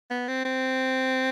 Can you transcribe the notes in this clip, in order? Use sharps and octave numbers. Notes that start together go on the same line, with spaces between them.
B3
C4
C4